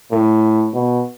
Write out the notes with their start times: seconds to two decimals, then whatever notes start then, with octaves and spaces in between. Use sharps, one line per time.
0.11 A2
0.74 B2